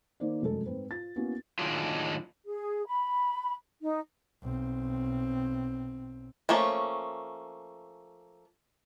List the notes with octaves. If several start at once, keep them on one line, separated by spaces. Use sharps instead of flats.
D#3 A#3 D#4 C5 D5
F1 F#2 G#3 A4
G#2 C4 B4
F4 A6
A#3 B3 C#4 E4 F#4
A2 D#3 F#3 G#3 D4 F4
G#4
B5
D#4
B1 C4
F3 A3 A#3 C#4